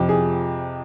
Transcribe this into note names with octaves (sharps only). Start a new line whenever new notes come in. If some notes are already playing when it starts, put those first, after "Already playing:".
Already playing: F2 C3 F3
G#4